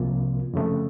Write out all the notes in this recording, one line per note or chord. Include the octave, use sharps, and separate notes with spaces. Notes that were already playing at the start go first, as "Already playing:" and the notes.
Already playing: C2 C3 F3 A#3 F4
F2 C#3 A3